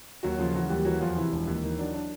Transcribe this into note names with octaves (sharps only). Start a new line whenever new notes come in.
D#2 F#3 F#4
C#3 F3 F4
E3 F#3 F#4
D#2 G3 G4
E3 F#3 F#4
E2 F3 F4
C3 E3 E4
E1
D#2
D#3
F#3 D4
D4